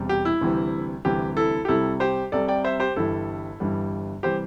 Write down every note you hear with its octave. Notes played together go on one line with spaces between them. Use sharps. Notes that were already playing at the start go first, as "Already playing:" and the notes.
Already playing: E1 E2 C3 G3
G4
E4
D2 C3 E3 G3
D2 C3 E3 G3 G4
E4 A4
G4
C2 C3 G3 E4 A4
G4 C5
C2 C3 G3 A4 D5
D5 G5
C5 E5
G4 C5
G1 G2 E3 G3 E4 A4
G1 G2 E3 G3
C3 E3 G3 G4 C5